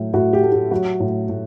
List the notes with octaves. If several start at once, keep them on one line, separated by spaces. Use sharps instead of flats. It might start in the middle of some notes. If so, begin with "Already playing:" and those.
Already playing: A2 F#3
A2 F#4
G4
A3
G4
F#3 F#4
A2
A2